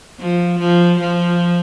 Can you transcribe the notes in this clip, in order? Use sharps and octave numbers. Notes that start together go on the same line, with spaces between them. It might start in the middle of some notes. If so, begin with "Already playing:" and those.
F3
F3
F3